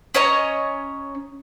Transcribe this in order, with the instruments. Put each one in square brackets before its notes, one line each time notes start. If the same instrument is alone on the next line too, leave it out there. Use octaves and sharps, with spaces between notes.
[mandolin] C#4 C#5 D#5 A#5